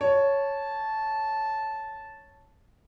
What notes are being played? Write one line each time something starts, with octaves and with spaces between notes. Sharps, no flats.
C#5 A5